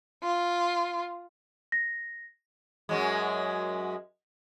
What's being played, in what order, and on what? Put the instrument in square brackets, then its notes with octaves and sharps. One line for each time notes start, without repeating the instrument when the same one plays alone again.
[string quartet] F4
[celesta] A#6
[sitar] F#2 F#3 G#3